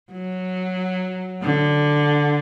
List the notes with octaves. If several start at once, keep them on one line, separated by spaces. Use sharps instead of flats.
F#3
D3